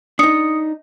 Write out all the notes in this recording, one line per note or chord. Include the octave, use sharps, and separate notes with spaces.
D4 D#4 D#6 C#7